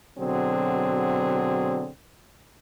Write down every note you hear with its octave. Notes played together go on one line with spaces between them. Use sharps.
B2 D3 F#3 C4 G#4